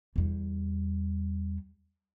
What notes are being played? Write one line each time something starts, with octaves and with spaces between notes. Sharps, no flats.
E2 G3